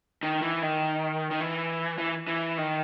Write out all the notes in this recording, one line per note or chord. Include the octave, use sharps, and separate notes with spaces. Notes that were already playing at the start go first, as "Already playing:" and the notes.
D#3
E3
D#3
D#3
E3
E3
E3
D#3